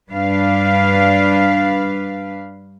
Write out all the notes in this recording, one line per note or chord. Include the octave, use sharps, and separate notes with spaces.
G2 D4 B4 F5